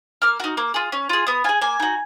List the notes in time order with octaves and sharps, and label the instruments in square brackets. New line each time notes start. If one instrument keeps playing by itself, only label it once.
[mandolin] A#3 F6
D#4 F#4
A#3
F4 G#4
C#4
F4 G#4
B3 D#6
F4 G#4 G#5
A#3 G#5
D#4 F#4